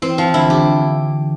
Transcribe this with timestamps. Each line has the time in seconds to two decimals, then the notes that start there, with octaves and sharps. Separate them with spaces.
0.02 E3 C4
0.18 E3 F3
0.34 D3 E4
0.50 D3 G4